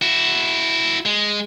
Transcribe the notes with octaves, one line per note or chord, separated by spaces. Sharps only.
E4 F#4
G#3